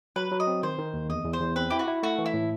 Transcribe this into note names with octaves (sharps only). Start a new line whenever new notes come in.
F#3 B4
F#3
D#5
C4
D#3 C5
D#3
D#2
E2 D#5
E2
C5
E2
C4 B4
E4 G4
F#4
E4
A3 F#4
E3
E4
A2